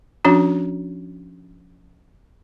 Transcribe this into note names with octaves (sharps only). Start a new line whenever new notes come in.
F3 C#4 D4 F#4